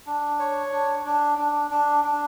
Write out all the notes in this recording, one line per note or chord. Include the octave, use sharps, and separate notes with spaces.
D4
C#5
D4
D4
D4
D4
D4